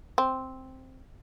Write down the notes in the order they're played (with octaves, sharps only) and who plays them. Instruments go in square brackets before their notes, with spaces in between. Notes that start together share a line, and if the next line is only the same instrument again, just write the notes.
[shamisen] C4